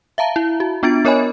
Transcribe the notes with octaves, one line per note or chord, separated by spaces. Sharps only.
E5 F5 A5 A#5
E4
F#4
B3 D4 F4 A6 D7
B3 A#4 C#5 D#5 G#5 B5